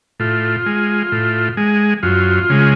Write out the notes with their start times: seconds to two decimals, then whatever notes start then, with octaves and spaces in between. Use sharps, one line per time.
0.20 A2 F4
0.66 G#3
1.12 A2
1.57 G#3
2.03 F#2 F4
2.50 C#3 G#3